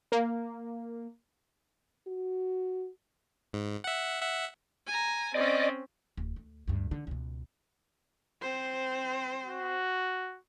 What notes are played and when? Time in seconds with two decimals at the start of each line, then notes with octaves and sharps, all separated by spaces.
0.12 A#3
2.07 F#4
3.53 G#2
3.84 E5 F#5
4.21 E5 F#5
4.87 G#5 A#5
5.34 C4 C#4 D5 D#5
6.17 D1
6.36 D2
6.68 D2 G2
6.91 D3
7.07 C#2 B2
8.41 C4 C5
9.45 F#4